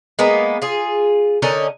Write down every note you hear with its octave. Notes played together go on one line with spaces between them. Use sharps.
G#3 A#3 B3
F4 G#4
D3 C#4 D#4 A#4